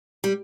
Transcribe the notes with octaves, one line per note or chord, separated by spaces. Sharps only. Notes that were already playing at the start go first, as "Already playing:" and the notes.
G3